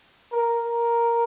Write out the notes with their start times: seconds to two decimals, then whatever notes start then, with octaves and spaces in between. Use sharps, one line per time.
0.32 A#4
0.64 A#4